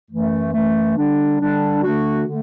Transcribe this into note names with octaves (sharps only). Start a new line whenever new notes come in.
F#2 E3 A3
F#2 E3 A3
D3 G3 D4
D3 G3 D4
D3 A3 D4 F#4
D3 A3